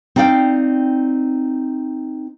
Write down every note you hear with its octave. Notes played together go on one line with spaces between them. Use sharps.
C4 D#4 D5 F5 G5